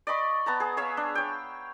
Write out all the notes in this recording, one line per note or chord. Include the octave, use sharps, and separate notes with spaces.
D5 D#5 B5 C#6
B3 A5 A#5
G#4
G#4 C#5 E5 F5
D4
C#5 G5